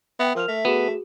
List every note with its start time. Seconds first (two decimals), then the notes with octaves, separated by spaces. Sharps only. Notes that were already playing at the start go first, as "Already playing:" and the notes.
0.19 B3 E5 G5
0.35 F3 A#4 F6 F7
0.48 A3 E5
0.65 B3 F#4 G#4 E7